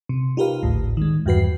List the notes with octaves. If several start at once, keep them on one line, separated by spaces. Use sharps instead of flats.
C3
D#4 F4 G4 A#4 B4 F5
G#1 D2 A2
D#3 G#3
E2 G2 F#4 B4 C7